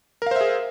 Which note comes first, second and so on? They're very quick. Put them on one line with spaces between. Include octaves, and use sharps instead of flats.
A#4 F5 C5 E5 G#4